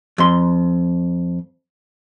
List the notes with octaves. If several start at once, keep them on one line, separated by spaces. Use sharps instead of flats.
F2 C6